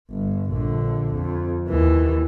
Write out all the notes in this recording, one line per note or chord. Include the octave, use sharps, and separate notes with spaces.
G1
A#1 D3
F2
D#2 E3